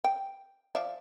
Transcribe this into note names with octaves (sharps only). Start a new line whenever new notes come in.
G5
F3 D5 E5